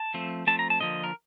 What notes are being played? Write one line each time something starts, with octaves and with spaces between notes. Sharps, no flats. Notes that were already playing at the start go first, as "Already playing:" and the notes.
Already playing: A5
F3 A3 C4
F3 A3 C4 A5
A#5
A5
D3 F3 A#3 D#5
A#4